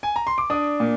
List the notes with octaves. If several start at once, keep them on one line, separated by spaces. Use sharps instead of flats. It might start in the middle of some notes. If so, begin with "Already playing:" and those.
G#5
A#5
C6
D6
D4 D#6
A#2